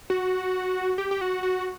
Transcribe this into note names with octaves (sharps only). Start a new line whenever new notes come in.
F#4
G4
G4
F#4
F#4